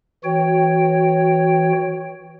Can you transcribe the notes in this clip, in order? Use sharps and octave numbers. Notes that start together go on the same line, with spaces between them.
E3 F#4 C#5 G5